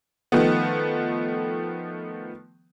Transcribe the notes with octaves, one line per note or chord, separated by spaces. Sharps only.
D#3 F3 A3 B3